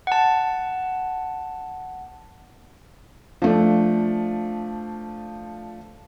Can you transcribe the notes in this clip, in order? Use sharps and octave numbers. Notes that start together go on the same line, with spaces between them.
F#5 A5
F3 A3 D4